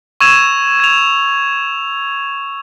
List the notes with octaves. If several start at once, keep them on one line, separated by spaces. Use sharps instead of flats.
C#6 E6 G#6 E7 F7
G#6 F7